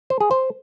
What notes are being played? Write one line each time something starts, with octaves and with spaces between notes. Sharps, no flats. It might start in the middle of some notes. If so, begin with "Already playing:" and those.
C5
G#4
C5